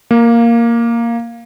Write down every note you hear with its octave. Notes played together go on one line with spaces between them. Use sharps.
A#3